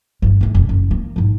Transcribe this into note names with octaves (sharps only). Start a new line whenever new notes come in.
G1 D2
G#2 A3
F1
F#1
A#3
A1 G#2